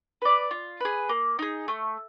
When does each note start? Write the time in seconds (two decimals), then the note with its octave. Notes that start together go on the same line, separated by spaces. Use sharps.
0.22 B4 D5
0.51 F4
0.81 G#4 B4
1.09 A#3
1.39 D#4 G#4
1.68 A3